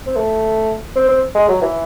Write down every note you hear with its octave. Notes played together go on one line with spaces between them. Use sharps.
C4
A3
C4
C4
G#3
F#3
E3